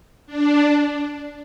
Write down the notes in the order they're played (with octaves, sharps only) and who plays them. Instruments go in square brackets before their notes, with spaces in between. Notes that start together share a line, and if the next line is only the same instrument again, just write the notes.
[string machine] D4